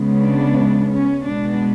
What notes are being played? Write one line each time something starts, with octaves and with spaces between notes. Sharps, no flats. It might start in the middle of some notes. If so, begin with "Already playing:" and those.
Already playing: C#3 G#3 B3
D4
C#4
B2 G#3 B3 D4